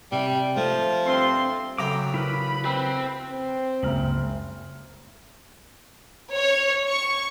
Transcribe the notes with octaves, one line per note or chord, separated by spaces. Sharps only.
C3 G3
F3 A3
G2 C4 C6
C#3 F#3 A3 G5 A#5 D6
E4 A#4 B4 B5
C4 B4
C4
F#1 C#2 G2 F6 F#7
C#5
C#6